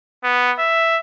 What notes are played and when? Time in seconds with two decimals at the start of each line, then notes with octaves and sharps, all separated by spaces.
0.24 B3
0.59 E5